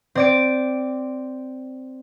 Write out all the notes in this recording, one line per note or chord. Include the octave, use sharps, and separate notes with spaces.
C4 D5 D7